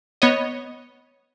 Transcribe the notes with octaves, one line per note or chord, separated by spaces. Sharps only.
B3 C#5 D#5